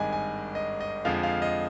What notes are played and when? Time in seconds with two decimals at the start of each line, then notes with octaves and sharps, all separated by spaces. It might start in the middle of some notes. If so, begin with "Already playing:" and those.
Already playing: G#1 G2 D#3 G#3 D#5 G#5
0.13 G#5
0.55 D#5
0.80 D#5
1.05 F2 D3 F3 G#3 F5
1.23 F5
1.42 D#5